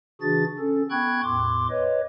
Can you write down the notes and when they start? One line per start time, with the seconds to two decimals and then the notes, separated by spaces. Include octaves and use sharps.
0.22 C#3 E3 D4 F#4 G#4 A6
0.59 C#4 A4
0.91 B3 G5 B5 C#6 F#6 G#6
1.23 E2 A2 C6 D6
1.70 B4 C#5 D#5